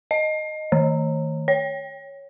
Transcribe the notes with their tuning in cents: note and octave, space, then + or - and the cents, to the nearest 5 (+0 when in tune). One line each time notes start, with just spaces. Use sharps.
D#5 -5
D#3 +25
C#5 +0